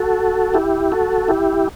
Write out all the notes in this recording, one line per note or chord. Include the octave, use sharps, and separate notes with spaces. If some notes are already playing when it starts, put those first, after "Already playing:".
Already playing: F#4 A4
E4 G4
F#4 A4
E4 G4